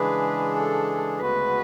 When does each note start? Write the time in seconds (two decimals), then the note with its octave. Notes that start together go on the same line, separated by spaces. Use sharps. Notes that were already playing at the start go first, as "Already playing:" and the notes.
Already playing: C#3 E3 G#3 D4 G#4 B4
0.56 A4
1.21 D2 C#3 G#3 B3 F#4 B4